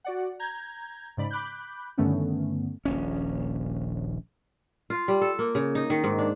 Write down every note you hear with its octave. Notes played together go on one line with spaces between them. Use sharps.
F#4 D5 F#5
A#5 G6 G#6
G#2 C#3 D5 B5
B5 D6 F#6 G6
G2 D3 D#3 A3 B3 C#4
D#1 A#1 C#4
F4
G3
A4
A#3
C#3
D#4
D#3
G#2
D4